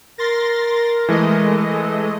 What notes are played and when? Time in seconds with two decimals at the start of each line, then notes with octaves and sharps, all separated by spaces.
0.18 A#4 C6 A6 A#6
1.09 E3 G#3 A3 D#5
1.70 A4